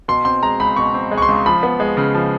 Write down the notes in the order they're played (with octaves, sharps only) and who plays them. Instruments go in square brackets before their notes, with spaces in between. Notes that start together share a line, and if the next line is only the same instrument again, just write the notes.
[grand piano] B2 C6
C4 C6
G#3 A#5
C#2 B5
B2 C#6
C4
G#3
C#6
C6
C#2
F3 B5
B3
G#3
C#3
F3